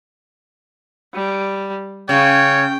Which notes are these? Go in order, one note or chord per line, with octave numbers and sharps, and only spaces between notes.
G3
C#3 C#5 G5